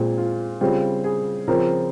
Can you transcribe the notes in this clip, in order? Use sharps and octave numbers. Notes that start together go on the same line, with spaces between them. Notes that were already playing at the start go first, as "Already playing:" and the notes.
Already playing: A#2 G#3 C4
F4
C#3 G3 C4 F4
G#4
C#3 F3 C4 A#4